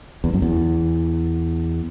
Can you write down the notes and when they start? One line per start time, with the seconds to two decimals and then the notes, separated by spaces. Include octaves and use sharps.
0.24 E2
0.33 F#2
0.42 E2